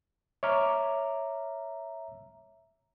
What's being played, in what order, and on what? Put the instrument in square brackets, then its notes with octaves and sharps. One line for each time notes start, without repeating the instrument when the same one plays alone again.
[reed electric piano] C#5 D6 F6 [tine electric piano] E5 A#5